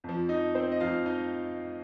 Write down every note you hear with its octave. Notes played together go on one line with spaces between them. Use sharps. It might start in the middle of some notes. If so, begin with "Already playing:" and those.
F2 F3
D#4 D#5
C4 C5
D#5
F2 F3 F4 F5
D#4 D#5